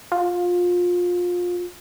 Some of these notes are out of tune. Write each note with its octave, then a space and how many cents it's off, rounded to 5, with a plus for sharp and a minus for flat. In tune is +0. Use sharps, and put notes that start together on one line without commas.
F4 +25